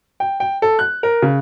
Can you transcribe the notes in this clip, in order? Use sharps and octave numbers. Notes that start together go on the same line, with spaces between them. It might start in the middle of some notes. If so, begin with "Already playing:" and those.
G5
G5
A4
F#6
A#4
C#3